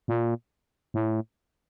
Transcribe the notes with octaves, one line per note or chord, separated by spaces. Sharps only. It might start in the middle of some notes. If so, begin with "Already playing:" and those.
A#2
A2